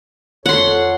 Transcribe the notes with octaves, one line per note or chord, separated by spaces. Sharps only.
F2 A4 C#5 F#5 C6